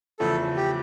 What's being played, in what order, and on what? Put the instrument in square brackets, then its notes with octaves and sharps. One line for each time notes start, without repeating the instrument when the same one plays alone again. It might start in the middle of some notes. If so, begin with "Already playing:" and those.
[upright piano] E2 C#3 F3 A3 [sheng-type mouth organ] A4
[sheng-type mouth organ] G4